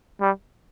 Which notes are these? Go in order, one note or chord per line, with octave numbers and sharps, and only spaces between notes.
G3